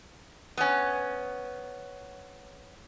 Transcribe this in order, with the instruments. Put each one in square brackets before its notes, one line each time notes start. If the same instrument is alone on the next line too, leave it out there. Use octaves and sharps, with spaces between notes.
[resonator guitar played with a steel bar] B3 C#4